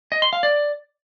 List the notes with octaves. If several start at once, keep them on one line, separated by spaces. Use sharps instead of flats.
D#5
C6
F5
D5